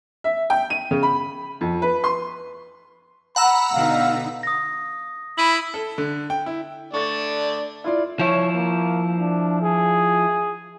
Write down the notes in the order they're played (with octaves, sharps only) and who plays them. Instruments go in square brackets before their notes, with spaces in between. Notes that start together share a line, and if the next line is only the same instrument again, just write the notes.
[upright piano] E5
G5
D#7
C#3
B5
F2
B4
C6
[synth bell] F#5 A#5 E6 [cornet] B5
[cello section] B2 D3 D#4 [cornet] F5
[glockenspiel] D#6 A#6
[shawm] E4 [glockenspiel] B5 D#7 F#7
[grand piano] A4
D3
G5
E4
[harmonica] A3 D4 D5 [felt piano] C#6 A6
[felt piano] E4 F4 D5
[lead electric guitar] F3 E4 [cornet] C#5
[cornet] A#3
D4
G#4